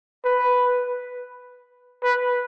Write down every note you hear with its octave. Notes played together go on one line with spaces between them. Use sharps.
B4
B4